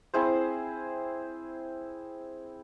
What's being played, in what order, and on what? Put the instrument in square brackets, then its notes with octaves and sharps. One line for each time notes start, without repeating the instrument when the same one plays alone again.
[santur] C4 E4 G#4 C5